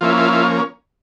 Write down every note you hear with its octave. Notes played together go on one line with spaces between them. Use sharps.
F3 A#3 C#4 E4 F4
F4
F4